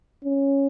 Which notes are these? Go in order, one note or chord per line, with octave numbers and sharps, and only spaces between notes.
C#4